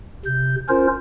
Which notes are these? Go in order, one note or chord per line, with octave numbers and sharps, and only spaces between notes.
C3 G6
C#4 F4 A#4 C5